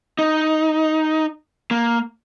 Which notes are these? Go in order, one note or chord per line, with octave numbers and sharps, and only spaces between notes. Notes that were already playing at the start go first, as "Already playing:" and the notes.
D#4
A#3